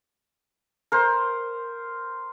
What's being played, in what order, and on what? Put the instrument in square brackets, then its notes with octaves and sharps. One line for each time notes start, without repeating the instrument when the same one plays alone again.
[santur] A#4 C5